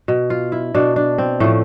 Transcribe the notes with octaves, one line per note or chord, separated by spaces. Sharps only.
B2
F4
E4
B2 D4
D4
C4
A2 F3 A3